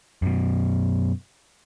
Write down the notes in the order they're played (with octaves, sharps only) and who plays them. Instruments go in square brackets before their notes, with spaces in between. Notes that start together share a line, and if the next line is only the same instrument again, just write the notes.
[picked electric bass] F#2 B2